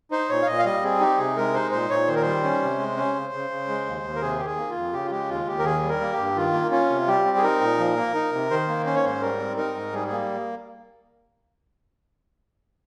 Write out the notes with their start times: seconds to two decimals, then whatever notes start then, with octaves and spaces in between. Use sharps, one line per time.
0.11 D#4 C5
0.29 A#2 C#5
0.42 F5
0.47 A#2 D#5
0.59 F5
0.65 G3 D#5
0.83 C4 G#4
1.00 D#4 G4
1.18 C3 G#4
1.37 G#3 A#4
1.54 D#4 C5
1.72 A#2 C5
1.90 A#2 C#5
2.08 D#3 C5
2.15 A#4
2.21 G3 C5
2.43 C#4
2.62 C3
2.79 G#3
2.97 C#4
3.15 C#3
3.33 C#3
3.51 C#3
3.68 G#3
3.86 D#2
4.03 D#2
4.16 A#4
4.21 C3 G#4
4.38 D#3 G4
4.45 G#4
4.57 A#3
4.70 F4
4.76 F2
4.93 C#3 G4
5.05 F4
5.10 G#3 G4
5.29 D#2 F4
5.46 D#2 G4
5.59 A#4
5.64 D#3 G#4
5.83 G3
5.89 A#4
6.00 A#3
6.12 G4
6.18 G2
6.36 D#3 F4
6.53 A#3
6.71 C#4 F4
6.90 C3
7.07 G3 G4
7.25 C4
7.37 G#4
7.43 D#4 A#4
7.61 A#2
7.79 F3
7.96 A#3
8.15 D#4
8.32 C3
8.50 D#3 C5
8.68 A#3
8.86 C#4 C5
8.96 C#5
9.04 G#2 C5
9.21 G3 A#4
9.39 C4
9.57 D#4 A#4
9.75 G#2
9.92 G3 G#4
10.08 A#3 G#4